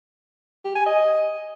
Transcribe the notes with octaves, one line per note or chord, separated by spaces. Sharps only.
G4
G#5
D#5